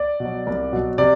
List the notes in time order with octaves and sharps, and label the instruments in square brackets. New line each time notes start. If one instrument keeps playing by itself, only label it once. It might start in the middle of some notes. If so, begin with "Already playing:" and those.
Already playing: [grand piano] D5
B2
F#3
C2
B2 F#3
C3 D5